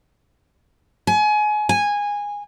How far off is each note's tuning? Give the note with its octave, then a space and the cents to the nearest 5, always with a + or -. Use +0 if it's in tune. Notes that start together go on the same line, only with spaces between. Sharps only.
G#5 +30
G#5 -15